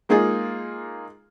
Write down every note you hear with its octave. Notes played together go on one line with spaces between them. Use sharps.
G#3 A#3 D#4 F4 G#4